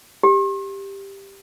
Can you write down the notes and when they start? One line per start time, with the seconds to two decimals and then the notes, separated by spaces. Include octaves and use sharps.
0.23 G4